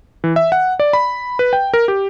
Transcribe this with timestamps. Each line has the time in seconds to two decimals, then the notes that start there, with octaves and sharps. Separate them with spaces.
0.24 E3
0.36 E5
0.52 F#5
0.80 D5
0.93 B5
1.39 B4
1.53 G5
1.74 A#4
1.88 G4